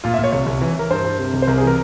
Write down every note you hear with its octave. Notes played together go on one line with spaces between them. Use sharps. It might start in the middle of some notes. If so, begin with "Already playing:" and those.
A#2 F4
E5
A#2 C#5
C2 C#5
C2
E3
E3 A#4
G2 C5
G2
C3
C2
C5
C2 A#4
G#4
E3 A#4